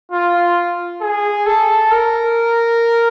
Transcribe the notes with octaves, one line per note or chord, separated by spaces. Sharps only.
F4
G#4
A4
A#4